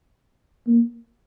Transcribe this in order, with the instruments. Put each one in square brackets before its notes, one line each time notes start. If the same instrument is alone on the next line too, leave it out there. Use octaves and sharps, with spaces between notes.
[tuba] A#3